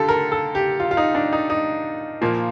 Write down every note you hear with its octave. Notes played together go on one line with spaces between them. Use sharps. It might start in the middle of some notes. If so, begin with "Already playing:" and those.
Already playing: D3 F4 G4 A4
A#4
A4
G4
F4
F4
D#4
D4
D#4
D#4
A#2 F3 A#3